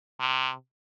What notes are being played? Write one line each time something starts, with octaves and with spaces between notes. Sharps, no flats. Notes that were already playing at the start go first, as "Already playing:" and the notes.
C3